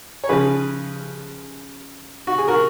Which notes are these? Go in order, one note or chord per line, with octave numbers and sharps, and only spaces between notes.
C#5
C#3 F3 G#4 B4
F#4
G#4
F#4 A#4